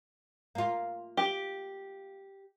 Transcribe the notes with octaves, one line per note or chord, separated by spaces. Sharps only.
A#3 F4
G4